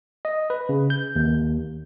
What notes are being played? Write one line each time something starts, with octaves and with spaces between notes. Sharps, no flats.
D#5
B4
C#3
G6
D#2